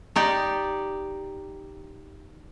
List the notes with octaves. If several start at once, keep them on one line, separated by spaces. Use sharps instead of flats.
D#4 G4 D5